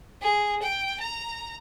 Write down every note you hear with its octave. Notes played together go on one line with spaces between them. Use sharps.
G#4
G5
A#5